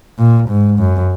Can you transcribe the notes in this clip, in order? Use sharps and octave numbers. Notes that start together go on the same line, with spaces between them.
A#2
G#2
F#2